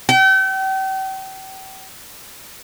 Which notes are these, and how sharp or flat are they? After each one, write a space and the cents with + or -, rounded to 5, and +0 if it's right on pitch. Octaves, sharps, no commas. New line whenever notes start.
G5 -40